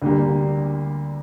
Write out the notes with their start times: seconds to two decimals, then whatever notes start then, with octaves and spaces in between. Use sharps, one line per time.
0.02 D2 D3 G3 A#3